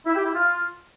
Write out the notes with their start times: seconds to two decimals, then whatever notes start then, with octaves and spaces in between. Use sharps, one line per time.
0.06 E4
0.15 G4
0.25 E4
0.34 F4